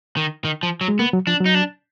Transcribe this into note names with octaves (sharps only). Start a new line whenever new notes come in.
D#3
D#3
F3
F#3
G#3
A#3 B3
F#3
F3 D4
F#3
D#4
D4